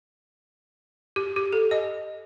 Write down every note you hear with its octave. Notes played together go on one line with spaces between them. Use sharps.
G4
G4
A4
D#5